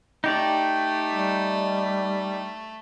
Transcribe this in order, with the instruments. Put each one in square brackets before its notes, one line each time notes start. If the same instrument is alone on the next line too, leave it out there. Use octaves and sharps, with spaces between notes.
[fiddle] A3 [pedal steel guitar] D#4 G4 D5
[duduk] G3